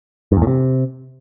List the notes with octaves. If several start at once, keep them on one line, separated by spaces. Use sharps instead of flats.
G2
E2
A2
C3